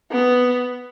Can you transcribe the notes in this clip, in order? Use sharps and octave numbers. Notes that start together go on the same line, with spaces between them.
B3